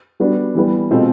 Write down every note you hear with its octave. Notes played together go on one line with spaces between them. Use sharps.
G3 B3 D4 F#4
E3 G3 B3
B2 G#3 C4 F4 A4